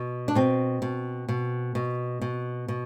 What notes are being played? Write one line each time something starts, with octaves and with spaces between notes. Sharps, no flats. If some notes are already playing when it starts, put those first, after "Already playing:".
Already playing: B2
D4
B2 C4
B2
B2
B2
B2
B2